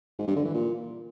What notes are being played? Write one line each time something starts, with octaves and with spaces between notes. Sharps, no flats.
G#2
G2
D3
E3
A#2